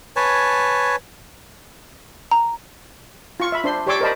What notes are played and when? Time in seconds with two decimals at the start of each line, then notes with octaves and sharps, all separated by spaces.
0.16 B4 C#5 G#5 A5
2.31 A#5
3.40 F4 C#6
3.52 E5 B5
3.64 D4 C5 C6
3.87 G4 C#5 D5 C6 D6 E6
4.01 A#4 C5 D5 D#5 A5 B5